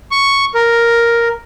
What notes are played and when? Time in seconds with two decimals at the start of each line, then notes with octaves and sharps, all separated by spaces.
0.11 C#6
0.54 A#4